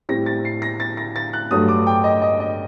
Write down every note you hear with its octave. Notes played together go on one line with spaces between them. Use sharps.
A2 G3 C4 A#6
A6
C7
A#6
A6
A#6
A6
F#6
G2 F#3 A3 D#6
D6
G5
D#5
D#5
D#5